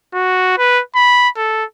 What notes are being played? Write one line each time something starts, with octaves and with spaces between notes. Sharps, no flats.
F#4
B4
B5
A4